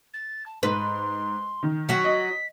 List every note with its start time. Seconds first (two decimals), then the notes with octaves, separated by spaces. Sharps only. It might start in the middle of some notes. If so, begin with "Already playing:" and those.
0.14 A6
0.46 A5
0.63 G#2 B4 C6
1.63 D#3
1.89 F#3 F#4 B6
2.04 D#5